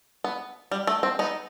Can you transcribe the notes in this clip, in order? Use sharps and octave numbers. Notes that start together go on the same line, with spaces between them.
B3
G3
A3
C4
B3 D#4